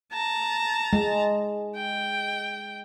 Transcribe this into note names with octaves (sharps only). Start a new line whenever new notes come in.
A5 A#5
G#3
G5